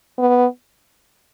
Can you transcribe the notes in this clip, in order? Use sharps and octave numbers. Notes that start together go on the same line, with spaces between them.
B3